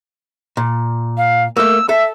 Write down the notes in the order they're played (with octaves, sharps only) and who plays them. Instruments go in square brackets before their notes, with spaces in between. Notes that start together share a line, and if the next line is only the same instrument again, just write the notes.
[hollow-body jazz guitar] A#2
[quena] F5
[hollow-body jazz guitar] A3 A#3 [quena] E6
[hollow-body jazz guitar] A4 [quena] E5